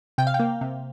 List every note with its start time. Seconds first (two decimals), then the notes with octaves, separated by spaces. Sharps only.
0.18 C3 G5
0.27 F5
0.34 G5
0.40 A#3
0.61 C3